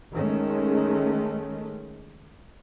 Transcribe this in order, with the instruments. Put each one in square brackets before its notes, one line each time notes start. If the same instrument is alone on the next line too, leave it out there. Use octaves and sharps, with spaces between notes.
[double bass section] D#3 G#3 A3 C#4